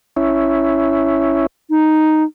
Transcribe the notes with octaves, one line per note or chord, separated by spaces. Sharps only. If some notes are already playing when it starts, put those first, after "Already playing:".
C#4 E4
D#4